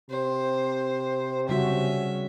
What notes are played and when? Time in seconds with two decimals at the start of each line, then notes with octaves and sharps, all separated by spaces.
0.11 C3 C5
1.49 C#3 G3 C#4 F#4 E5